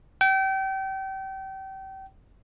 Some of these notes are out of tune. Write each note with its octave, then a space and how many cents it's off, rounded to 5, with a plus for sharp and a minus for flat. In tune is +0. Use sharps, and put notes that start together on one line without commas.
G5 -30